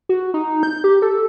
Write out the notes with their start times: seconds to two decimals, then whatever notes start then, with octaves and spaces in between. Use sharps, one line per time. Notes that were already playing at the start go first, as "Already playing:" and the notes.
0.09 F#4
0.34 D#4
0.63 G6
0.84 G4
1.02 A4